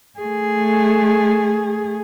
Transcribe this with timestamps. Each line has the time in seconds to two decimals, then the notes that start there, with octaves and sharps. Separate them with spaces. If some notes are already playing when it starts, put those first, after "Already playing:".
0.19 A3 G#4